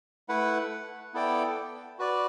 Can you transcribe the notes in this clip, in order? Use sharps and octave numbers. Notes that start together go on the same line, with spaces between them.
A3 E4 B4 F#5
B3 E4 A4 D5 G5
F#4 B4 D5